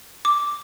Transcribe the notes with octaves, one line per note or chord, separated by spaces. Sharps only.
D6